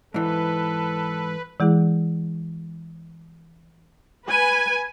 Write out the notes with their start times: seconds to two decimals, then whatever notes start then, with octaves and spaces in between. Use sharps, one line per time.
0.14 G#2 E3 A4 B4
1.60 E3 G#3 E4 G#4
4.26 B4 G#5